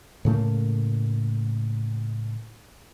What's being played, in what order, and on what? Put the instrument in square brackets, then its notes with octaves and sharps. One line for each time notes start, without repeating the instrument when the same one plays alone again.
[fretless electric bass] A2 C#3 A3 A#3